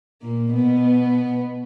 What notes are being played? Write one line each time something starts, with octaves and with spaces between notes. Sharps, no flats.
A#2 A#3
B2 B3